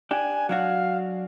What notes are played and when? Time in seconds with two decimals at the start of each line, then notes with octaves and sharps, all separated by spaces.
0.11 D4 G4 G#5
0.49 F#3 D4 F#4 F5